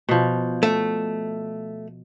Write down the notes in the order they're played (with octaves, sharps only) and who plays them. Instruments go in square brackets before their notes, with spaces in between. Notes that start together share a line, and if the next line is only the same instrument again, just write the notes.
[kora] B2 F3
[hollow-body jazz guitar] A3